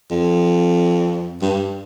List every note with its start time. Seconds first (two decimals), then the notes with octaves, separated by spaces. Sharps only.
0.11 F2
1.41 G2